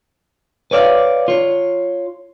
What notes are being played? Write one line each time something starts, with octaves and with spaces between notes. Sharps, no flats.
B4 C#5 D5 E5 F5
F4 C#5